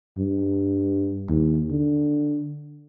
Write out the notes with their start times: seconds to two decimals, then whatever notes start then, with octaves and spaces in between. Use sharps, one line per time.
0.18 G2
1.29 D#2
1.71 D3